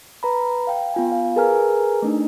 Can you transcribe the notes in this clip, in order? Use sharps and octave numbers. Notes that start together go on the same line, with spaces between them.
B4 A#5 B5
F5 G5
B3 F4 G#5
F5
G#4 A#4 B4 G#5 A#5 F6
A3 D4 D#4